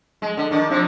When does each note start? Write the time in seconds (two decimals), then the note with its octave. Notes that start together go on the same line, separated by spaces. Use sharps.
0.22 G#3
0.37 D3
0.51 D#3 D4
0.70 C3 F3